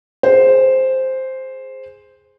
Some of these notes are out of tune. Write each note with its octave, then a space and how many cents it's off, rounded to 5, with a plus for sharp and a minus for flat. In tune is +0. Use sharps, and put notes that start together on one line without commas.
G#4 +0 C5 +0